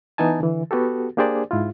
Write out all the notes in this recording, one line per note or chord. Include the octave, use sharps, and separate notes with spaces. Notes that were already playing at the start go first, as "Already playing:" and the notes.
E3 B3 D#4 G#5 A5
D3 E3
B3 F#4 G4 A4
A#3 D4 G4 G#4 C5 D5
G#2 E4 F4